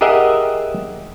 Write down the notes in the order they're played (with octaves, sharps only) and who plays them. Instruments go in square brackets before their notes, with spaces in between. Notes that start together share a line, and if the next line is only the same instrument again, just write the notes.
[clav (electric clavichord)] G4 G#4 A#4 D#5 E5 F#5